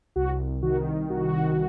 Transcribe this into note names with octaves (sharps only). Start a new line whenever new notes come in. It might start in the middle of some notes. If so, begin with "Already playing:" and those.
C2 F#4
D#3 F#4
C2 F#4